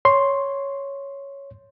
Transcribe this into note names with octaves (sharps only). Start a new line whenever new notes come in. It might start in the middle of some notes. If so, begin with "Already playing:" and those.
C#5 C6